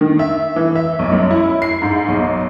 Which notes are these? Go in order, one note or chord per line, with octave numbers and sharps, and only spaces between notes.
D#3
E5
E3
E5
B1
F#2
E4
C7
G#2
B1